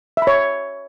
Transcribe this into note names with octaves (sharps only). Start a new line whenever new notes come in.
C#5 E5 B5